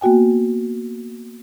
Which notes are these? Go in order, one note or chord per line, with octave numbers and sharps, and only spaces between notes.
A#3 B3 F#4 G5 G#5